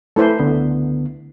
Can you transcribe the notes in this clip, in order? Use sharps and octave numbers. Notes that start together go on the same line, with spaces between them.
A3 E4 A4 B4 C5
C#2 D3 B3